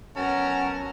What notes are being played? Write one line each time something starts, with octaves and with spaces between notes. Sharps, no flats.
B2 F#3 C#4 A#4 F#5 A5